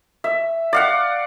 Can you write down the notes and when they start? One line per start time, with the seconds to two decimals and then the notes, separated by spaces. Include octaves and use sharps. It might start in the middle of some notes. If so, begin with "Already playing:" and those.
0.24 E5
0.73 D5 F5 F#5